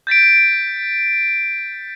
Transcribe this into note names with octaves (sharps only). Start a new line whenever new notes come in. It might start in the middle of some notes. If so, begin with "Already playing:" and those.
G6 A6 B6 D7